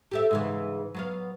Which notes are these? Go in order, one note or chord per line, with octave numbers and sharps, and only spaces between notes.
G4 A4 E5
G#2 C#3 E3
F#3 B3 F5